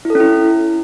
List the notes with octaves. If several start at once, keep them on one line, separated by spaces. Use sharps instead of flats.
E4
A4
C#4
E4